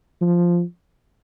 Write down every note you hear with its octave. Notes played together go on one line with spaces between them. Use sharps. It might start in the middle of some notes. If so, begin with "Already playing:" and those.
F3